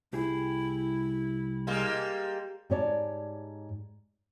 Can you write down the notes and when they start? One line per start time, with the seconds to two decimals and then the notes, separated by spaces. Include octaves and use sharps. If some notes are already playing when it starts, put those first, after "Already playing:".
0.13 C2 E4 G4 G#4
1.67 G3 G#3 A#3
2.70 G#2 G4 C#5 D5 A5